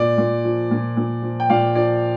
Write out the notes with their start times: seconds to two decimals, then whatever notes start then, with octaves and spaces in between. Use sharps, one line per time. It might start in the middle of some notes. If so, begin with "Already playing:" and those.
Already playing: A#2 D5
0.18 A#2
0.44 F3
0.71 A#2
0.97 A#2
1.22 F3
1.40 G5
1.49 A#2 D5 F5
1.75 F3 D5